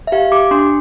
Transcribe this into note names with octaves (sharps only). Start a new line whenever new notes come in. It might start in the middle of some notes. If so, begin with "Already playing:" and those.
E5
G4 F5
G4 D6
D4 C6